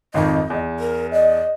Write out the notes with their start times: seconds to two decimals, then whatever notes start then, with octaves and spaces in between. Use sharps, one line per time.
0.14 G#1 F2 D#3 D#5
0.50 E2
0.80 A#4
1.13 D5 D#5